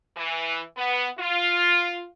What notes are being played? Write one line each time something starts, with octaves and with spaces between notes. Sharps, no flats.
E3
B3
F4